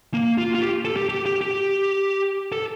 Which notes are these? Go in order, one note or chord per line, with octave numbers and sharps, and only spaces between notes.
A#3
F4
F4
G4
A4
G4
G4
G4
G4
A4